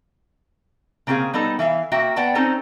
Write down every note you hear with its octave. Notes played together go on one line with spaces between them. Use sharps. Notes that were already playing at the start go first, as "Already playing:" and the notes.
C#3 A#3 C4 G4 G#4 F5
G3 B3 D#4 A4
E3 E5 F5
A#3 F#4 E5 G5
B3 D5 F#5 G5 A5
C4 C#4 D#4 A4 C5